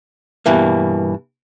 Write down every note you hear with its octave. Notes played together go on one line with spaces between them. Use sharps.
G2 B2 E3 A#3